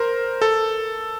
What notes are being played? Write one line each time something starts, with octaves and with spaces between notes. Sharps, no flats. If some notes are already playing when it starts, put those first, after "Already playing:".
Already playing: A#4 C5
A4